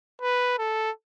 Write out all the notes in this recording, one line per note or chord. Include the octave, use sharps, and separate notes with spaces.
B4
A4